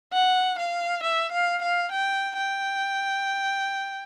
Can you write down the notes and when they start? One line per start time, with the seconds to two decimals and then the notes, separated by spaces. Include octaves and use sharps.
0.13 F#5
0.58 F5
1.03 E5
1.32 F5
1.62 F5
1.92 G5
2.37 G5